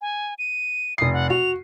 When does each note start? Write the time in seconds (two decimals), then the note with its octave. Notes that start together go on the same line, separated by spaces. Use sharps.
0.01 G#5
0.39 D#7
0.98 F1 D#6 C7
1.13 F#5
1.30 F#4 F7